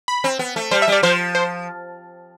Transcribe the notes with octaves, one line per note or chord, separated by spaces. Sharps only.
B5
C4
B3
A3
G3 C5
E5
G3 D5
F3 C5
C5